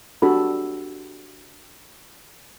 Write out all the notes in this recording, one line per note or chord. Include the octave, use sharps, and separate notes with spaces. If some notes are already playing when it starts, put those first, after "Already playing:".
D4 F#4 G4 A4 B5